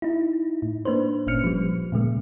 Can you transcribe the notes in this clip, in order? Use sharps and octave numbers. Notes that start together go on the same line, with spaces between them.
D#4 E4
A2
A#3 D4 B4 C5
G1 A#2 C#4 F6 C#7
F3 G3
A#2 C#3 G#3 A#3